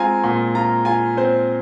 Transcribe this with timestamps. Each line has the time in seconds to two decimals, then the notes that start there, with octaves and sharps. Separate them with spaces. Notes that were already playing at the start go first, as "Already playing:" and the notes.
Already playing: G#3 C4 F4 G#5 A#5
0.24 A#2
0.55 F4 A#5
0.85 F4 G#5
1.17 C4 C5